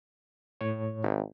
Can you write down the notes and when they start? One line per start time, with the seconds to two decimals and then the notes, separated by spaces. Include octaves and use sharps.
0.61 A2 C#5
1.02 G#1